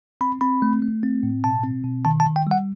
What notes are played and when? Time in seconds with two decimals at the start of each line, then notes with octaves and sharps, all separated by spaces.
0.21 C4 B5
0.41 C4 B5
0.62 A3
0.82 A3
1.03 C4
1.23 A2
1.44 B2 A5
1.64 C4
1.84 B2
2.05 D#3 A5
2.20 A5
2.26 D#3
2.36 G5
2.47 G3 F#5